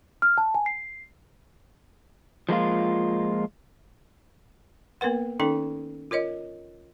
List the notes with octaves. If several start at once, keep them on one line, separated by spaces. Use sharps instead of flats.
F6
A5
G#5
C7
F3 G#3 A#3 F4
A#3 B3 A#4 B4 F#5
D#3 C#4 D#4 A4 G5
F4 A#4 C#5 D#5